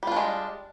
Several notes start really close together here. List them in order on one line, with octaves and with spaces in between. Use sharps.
G3 F4 D4 G#3